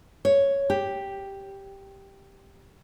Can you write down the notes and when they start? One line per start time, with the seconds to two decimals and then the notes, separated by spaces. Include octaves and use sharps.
0.25 C#5
0.70 G4